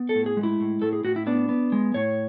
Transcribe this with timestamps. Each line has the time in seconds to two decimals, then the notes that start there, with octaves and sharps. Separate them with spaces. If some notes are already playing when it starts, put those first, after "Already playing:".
Already playing: B3
0.09 A4
0.15 A2
0.26 G#4
0.37 G#3
0.43 E4
0.60 A2
0.82 A2 A4
0.93 G#4
1.04 A2 F#4
1.16 E4
1.26 B3 D4
1.49 B3
1.72 G#3
1.94 A2 C#5